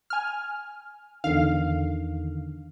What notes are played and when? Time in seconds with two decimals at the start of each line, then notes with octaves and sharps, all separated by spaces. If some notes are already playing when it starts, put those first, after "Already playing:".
0.10 G#5 F6
1.24 E2 D3 D#3 F5